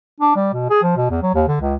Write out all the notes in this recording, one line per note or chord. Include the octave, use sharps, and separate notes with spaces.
D4
G3
B2
G#4
F3
B2
E2
F#3
D#2
D3
C#2